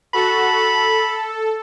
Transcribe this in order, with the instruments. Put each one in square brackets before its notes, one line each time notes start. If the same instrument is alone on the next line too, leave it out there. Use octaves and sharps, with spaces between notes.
[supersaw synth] F#4 A4 [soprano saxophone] B5
[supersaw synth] A4